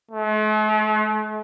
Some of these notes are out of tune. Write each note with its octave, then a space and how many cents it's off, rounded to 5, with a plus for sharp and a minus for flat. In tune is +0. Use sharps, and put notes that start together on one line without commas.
A3 -45